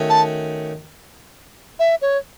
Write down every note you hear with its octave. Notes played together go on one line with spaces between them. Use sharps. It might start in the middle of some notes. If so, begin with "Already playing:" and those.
Already playing: D#3 A3 C#4 F#4
A5
E5
C#5